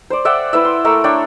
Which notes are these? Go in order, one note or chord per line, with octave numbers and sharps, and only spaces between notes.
C5 D5
D5 E5 F#5 G5
E4 B4 E5
C6
A3 A4 A#4 E5
D4 C#5 G5